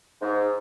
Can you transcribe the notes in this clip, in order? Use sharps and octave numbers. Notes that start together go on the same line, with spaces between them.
G#2